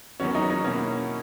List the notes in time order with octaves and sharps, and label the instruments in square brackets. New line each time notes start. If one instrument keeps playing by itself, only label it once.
[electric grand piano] E2 D#3 F#3 B3 F#4 [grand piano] C#4
[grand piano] D#4
D#4
[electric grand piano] B2 A#3 E4 [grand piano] C#4